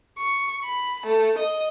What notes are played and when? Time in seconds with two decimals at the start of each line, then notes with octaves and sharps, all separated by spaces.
0.18 C#6
0.65 B5
1.06 A3
1.38 D#5